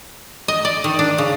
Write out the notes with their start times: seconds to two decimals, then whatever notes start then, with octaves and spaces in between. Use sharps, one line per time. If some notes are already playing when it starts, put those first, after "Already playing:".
0.48 D#5
0.65 D5
0.84 D#3
0.99 D4
1.18 C#3